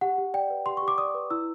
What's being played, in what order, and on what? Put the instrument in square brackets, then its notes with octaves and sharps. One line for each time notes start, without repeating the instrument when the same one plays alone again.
[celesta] G4 F#5
G4
D5 G5
B4
G4 C6
C#6
G4
D6
D5 D#6
B4
E4 E6